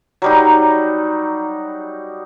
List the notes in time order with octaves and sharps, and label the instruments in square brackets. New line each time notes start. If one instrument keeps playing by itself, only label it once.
[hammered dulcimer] F#3 G3 D#4